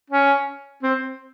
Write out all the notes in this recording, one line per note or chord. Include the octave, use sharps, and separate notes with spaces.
C#4
C4